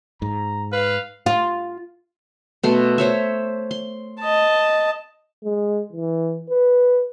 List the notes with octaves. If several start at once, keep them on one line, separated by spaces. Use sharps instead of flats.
G#2 A#5
B4 F5
F4
B2 A3 C6
C5 C#5 E5
C6
D#5 A5
G#3
E3
B4